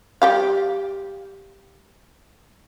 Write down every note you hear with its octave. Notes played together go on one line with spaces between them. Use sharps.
G3 G4 F5